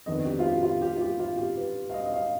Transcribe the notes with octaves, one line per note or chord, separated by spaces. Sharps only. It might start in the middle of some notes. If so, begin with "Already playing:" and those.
F2 D#3 B3 D4 D#5
G4
F4
G4
F4
G4
F4
G4
F4
G4
B4
F5
D#5
D#5
F5